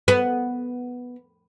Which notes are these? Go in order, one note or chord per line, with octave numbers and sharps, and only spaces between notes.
B3